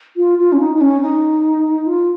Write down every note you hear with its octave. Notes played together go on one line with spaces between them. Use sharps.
F4
F4
C#4
D#4
D#4
C#4
D#4
F4